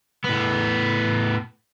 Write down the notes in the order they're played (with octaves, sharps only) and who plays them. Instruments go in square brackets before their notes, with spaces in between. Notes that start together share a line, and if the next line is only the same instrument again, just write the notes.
[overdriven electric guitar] A2 B3